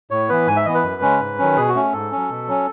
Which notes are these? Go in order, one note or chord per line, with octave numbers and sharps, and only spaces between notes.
A2 C#5
E3 B3 B4
G#2 G#5
E5
E3 B3 D#5
B4
F#2
C#3 G#3 C#4
G#2
D#3 F#3 C#4
B2 G#4
F#4
A3 C#4
G#2 A4
F#3 C#4
B2
F#3 C#4